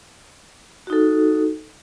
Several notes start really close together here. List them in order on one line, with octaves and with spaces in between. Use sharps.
F#4 D#4 A4